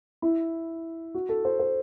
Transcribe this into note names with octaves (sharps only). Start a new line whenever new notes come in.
E4
F#4
A4
C5
C5